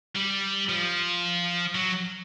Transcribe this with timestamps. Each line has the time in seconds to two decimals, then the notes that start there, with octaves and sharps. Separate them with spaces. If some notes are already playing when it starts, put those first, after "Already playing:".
0.15 G3
0.69 F3
1.75 F#3